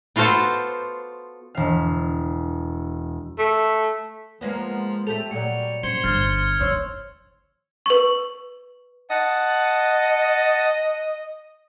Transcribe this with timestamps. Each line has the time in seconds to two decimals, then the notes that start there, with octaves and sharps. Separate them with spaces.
0.16 B3 F4 F#4 A4 C5
1.55 E1 F5
3.38 A3
4.41 F3 G#3 A#3 B3
5.07 A3 G4 A4 F7
5.31 A#2 F#3 G3 C#7
5.83 F#2 C5 G#6 C#7 G7
6.04 G1 F6 G#6 A6
6.60 D#3 C5 C#5 E6
7.86 B4 C#6
9.10 D#5 F#5 A5